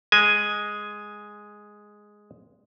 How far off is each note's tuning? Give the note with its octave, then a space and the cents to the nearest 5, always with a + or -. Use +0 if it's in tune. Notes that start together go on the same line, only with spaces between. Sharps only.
G#3 +0 G#5 +0